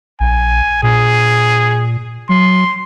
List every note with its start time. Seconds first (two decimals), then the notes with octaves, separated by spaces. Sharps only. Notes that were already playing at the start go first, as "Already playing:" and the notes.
0.20 A#1 G#5
0.83 A#2 G#4
2.29 F#3 C6